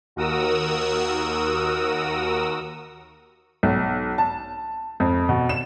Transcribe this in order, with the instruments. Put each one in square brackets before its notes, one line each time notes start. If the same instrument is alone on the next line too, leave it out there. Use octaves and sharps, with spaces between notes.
[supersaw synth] D#2 F#4 A#4 D#6 E6
[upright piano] B1
A5
F2
B2
E7